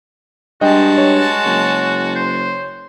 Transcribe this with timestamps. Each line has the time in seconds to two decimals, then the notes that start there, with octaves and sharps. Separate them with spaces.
0.61 G2 G#3 F#4 D#5 G5 A5
0.98 C#5
1.45 F#1
2.15 C5